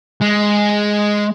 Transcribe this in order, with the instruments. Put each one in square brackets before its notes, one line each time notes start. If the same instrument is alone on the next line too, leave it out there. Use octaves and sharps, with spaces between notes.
[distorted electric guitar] G#3